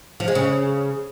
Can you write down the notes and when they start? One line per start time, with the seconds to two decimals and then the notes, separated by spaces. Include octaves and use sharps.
0.20 F3
0.28 G#3
0.35 C#3